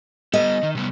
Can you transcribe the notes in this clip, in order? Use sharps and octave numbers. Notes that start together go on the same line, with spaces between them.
G3 B3 D#5
D#3
C3 G3 B3